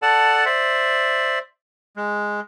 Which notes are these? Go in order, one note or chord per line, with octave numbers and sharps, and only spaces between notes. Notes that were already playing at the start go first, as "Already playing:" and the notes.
A4 D5 F#5 A5
C5 D5 E5
G#3